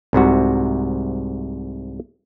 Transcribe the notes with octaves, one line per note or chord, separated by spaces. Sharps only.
C2 G#2 C3 F#4